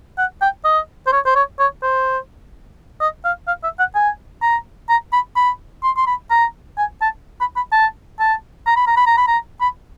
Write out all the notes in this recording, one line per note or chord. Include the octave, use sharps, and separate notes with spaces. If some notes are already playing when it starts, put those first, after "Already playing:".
F#5
G5
D#5
C5
C#5
C5
C#5
C#5
C5
D#5
F5
F5
E5
F#5
G#5
A#5
A#5
B5
B5
C6
C6
B5
A#5
G#5
A5
B5
B5
A5
A5
A#5
B5
A#5
B5
A#5
B5
A#5
B5